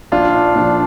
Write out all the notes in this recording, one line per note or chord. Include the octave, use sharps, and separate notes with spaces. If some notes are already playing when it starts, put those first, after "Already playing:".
A#1 D4 F4
D4
A#2 F3 D4